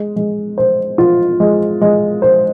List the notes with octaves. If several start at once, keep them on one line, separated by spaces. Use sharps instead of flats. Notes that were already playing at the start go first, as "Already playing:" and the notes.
Already playing: G#3
G#3
C5
F4
G#3
G#3
C5